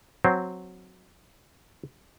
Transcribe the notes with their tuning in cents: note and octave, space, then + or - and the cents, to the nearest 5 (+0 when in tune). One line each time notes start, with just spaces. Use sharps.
F#3 -5 C4 +0 C5 +0